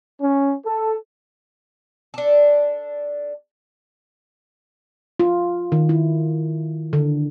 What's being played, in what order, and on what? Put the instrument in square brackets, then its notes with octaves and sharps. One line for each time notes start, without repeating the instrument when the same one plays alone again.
[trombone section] C#4
A4
[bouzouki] D4 A4
[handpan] F4
D#3
E4
D3